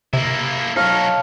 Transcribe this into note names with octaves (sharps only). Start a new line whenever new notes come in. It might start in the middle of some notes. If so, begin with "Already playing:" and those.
C3 A#3 E4
F#3 D#4 A4 C#5 F5